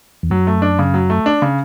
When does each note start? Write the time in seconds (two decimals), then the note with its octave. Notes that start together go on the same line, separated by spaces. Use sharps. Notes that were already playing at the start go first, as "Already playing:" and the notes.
0.23 E2
0.30 F#2 F#3
0.47 A3
0.62 D4
0.79 C#3
0.94 F#3
1.10 A3
1.26 D4
1.42 C#3